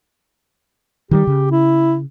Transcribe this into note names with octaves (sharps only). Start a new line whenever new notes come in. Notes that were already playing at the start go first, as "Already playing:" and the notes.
D#3 E3 G3 G4
C#3
E4